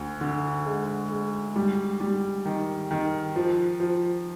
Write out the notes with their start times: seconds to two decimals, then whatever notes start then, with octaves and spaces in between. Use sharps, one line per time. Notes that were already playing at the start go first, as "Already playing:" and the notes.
Already playing: D2
0.21 D3
0.66 G#3
1.11 G#3
1.56 G3
2.00 G3
2.45 D#3
2.91 D#3
3.36 F3
3.80 F3